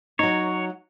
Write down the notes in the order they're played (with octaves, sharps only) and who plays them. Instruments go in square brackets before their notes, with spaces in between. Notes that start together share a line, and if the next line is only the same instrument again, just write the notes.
[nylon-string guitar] F#3 D#4 [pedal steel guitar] C#5